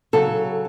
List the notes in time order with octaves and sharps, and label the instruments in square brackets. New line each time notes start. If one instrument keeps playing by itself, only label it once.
[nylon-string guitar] C#3 F#3 A4